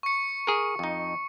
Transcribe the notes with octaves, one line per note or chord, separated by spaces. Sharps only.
C#6 C#7
G#4 A#4
F2 D#4